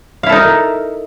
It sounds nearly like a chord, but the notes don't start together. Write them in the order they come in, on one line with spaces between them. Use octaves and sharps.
F5 E4 A4 D#4 A#4